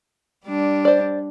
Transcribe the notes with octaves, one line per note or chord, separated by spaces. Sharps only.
G3 D4
C5 D5